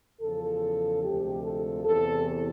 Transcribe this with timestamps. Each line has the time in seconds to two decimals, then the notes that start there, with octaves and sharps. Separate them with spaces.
0.20 E2 C#3 F3 A4
1.02 D2 C3 F3 G#3 G4
1.43 A4
1.85 E2 C3 E3 A4